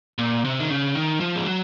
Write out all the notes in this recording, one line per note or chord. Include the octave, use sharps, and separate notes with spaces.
A#2
C3
D#3
C#3
D#3
F3
G#3
F#3